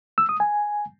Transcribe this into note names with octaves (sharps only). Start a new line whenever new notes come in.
E6
D#6
G#5